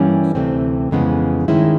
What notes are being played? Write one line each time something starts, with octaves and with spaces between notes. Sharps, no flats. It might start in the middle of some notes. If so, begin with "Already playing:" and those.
Already playing: G2 E3 G3 A#3 C#4
D2 C3 E3 A3 C4
F2 C#3 E3 G#3 B3
G2 D#3 G#3 C#4 E4